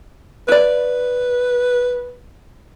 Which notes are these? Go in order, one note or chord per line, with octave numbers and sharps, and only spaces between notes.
E4 B4 D5